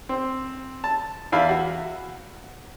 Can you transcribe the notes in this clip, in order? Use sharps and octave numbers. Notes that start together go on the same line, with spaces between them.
C4
A5
E2 E4 F5 B5
F#4